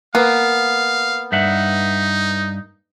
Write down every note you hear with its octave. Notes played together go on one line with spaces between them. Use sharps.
A#3 B3 F5
G2 D#4 E5 F#5